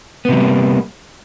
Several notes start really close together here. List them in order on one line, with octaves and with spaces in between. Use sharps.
B3 C3 F#3 G3 A#3